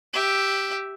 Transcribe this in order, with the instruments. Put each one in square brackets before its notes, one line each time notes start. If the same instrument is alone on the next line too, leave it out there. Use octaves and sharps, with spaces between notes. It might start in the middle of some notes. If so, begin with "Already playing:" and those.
[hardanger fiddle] G4 E5